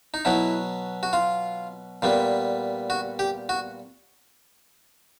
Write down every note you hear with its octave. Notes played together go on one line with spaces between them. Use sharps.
D#4
B2 F#3 B3 E4
F#4
F4
A#2 G3 B3
F#4
G4
F#4